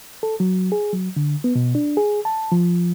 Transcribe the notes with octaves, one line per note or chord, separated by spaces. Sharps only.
A4
F#3
G#4
F#3
D3
B3
B2
D4
G#4
A5
F3